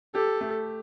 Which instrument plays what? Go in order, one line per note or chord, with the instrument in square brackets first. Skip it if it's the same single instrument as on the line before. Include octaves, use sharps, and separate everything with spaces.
[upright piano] G4 [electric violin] A4
[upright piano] A3